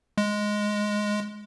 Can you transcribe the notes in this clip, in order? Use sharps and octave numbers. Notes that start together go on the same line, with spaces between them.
G#3